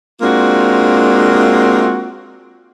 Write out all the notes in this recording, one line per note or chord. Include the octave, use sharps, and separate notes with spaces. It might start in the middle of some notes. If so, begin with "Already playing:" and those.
G#3 A#3 C4 D4 F4 F#4